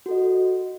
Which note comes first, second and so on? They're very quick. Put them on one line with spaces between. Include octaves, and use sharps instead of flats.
F#4 A4 D#5